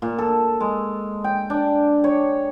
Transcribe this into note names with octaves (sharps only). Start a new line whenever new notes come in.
A#2
A4
G#3
G5
D4
C#5